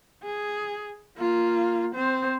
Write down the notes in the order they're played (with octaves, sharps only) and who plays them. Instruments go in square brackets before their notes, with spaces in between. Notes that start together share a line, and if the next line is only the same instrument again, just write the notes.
[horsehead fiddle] G#4
A#3 F4
C4 C5